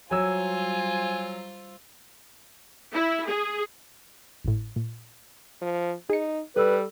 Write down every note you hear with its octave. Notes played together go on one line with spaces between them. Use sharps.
F#3 G3 F4 C5 G#5 E6
E4
G#4
G#1 A2
A#2
F3
D#4 G#4 C#7
G3 A4 B4 E6